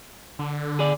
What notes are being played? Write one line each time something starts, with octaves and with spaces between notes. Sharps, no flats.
D3
G#4 D5